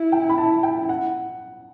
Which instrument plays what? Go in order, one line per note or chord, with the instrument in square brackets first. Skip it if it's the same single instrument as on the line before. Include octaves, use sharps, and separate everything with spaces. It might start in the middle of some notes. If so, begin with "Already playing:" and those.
Already playing: [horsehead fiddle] E4
[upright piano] G5
B5
A5
G5
F#5